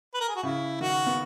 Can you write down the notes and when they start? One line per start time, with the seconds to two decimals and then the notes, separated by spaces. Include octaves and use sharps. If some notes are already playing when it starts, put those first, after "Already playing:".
0.14 B4
0.20 A#4
0.28 G#4
0.36 F#4
0.43 C#3 E4
0.81 D#3 F#4
1.07 B3